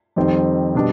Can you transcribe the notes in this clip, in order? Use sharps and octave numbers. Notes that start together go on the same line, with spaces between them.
F2 D#3 G3 C4
B2 G3 D4